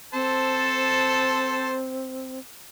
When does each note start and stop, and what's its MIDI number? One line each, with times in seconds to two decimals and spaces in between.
0.13 2.39 60
0.13 1.75 69
0.13 1.75 72
0.13 1.75 81